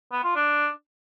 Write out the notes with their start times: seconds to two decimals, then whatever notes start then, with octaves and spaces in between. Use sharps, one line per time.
0.12 B3
0.24 F4
0.36 D4